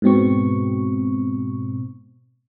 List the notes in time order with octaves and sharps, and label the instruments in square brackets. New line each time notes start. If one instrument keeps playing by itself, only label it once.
[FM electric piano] G#2 B2 C4 C#6